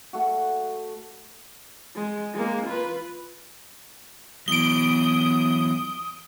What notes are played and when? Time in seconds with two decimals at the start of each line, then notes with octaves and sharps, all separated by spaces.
0.13 A3 F#4
1.95 G#3
2.34 G#3 A#3
2.67 F4 B4
4.48 E3 F#3 B3 D#6 D7 G7